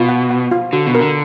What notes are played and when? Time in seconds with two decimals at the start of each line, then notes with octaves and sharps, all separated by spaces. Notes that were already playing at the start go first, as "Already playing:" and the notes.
Already playing: B2 F4
0.09 F#5
0.30 F#5
0.51 F4
0.73 D3 F#4
0.87 B2
0.95 A#4
1.01 D3